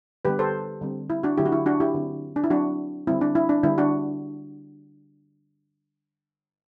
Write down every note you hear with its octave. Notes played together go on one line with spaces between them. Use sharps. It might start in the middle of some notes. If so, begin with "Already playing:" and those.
D3 G3 B3 G4 B4
A4 C5
D3 G3 C4
E4
D4 F#4
D3 F#3 A3 E4 G4
F#4
E4
D4 F#4
E4 G4
D3 F#3 C4
D4
E4
F#3 C4 D4 F#4
D3 G3 C4 E4
D4
E4
D4
D3 G3 B3 E4
D4 F#4